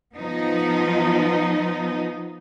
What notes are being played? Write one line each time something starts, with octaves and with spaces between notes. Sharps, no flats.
F3 B3 D#4